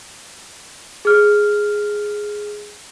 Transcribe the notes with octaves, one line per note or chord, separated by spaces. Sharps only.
G#4 F6